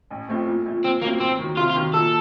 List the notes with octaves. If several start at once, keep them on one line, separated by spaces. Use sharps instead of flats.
A1
A2 F3 A3 C4
A#2
F3 A3
A#2 C4
F#3 A3 A#3 C4
D#2 C4
D#3 F#3
C3 F4
F4
D#3 F#3
A#2 A4